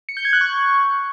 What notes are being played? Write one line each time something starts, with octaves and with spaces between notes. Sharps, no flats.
C#7
G6
G#6
F#6
C#6